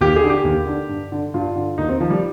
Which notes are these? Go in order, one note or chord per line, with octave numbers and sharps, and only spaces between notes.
D#2 G4
G#4
D3
G4
D#2
D3
G2
D3
G2 F4
D3
D#2 D#4
C4
D#3 F3
G3